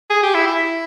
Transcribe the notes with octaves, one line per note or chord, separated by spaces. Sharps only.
G#4
G4
E4
E4